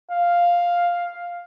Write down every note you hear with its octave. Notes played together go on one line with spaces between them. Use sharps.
F5